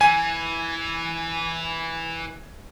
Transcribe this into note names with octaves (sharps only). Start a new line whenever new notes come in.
E3 G#5